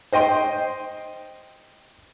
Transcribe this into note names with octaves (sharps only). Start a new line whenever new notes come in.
C5 D#5 G5 C6